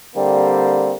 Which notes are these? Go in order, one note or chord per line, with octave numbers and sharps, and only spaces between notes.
D3 G3 A#3 C4